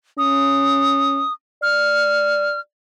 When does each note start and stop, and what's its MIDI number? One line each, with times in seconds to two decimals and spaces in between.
0.18 1.22 61
0.18 1.33 87
1.62 2.57 74
1.62 2.60 89